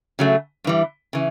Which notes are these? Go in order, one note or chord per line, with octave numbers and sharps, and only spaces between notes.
C#3 F#3 A3
G2 E3 G3
C#3 E3